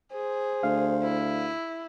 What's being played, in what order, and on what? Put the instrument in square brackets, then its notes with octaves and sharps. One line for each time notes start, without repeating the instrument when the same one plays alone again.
[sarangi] G#4 [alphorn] C5
[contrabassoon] D2 [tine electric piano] F5
[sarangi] E4